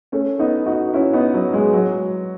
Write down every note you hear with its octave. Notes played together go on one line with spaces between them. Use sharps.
A3 C#4
B3 D#4
D#4 F#4
C#4 E4
B3 D#4
F#3
G#3
F#3